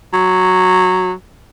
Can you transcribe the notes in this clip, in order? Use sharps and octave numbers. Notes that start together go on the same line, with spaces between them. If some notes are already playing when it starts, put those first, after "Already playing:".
F#3